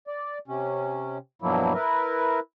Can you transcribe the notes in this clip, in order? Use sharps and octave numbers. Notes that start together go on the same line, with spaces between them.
D5
C3 C#4
G2 B2 F3 F#3 A#3 E4
E4 A#4 B4